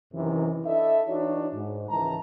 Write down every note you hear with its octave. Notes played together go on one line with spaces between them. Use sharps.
F#2 C3 D#3 E3
D4 E4 A4 D#5 E5
E3 D4 D#4 F#4 C#5
G#2
C#2 D#3 E3 A5 A#5